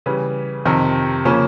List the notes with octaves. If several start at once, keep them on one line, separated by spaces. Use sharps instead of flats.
C#3 E3 G3
F2 C3 D#3
C#3 F3 A#3 C#4